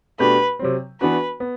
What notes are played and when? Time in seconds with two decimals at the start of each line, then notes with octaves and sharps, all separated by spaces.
0.19 B2 A3 D4 G4 B4
0.59 C3 F#3 C4
1.01 E3 B3 D4 F#4 B4
1.40 B3